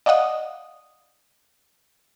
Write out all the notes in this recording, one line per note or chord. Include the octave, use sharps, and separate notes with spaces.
D5 D#5 F5 F#5 D#6